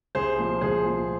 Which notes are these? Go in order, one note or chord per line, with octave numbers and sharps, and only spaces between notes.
C2 G#4 C5
A#2 F3
C2 G#4 C5
A#2 F3